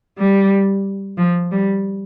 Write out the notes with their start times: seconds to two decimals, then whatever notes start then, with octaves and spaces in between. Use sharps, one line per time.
0.18 G3
1.18 F3
1.51 G3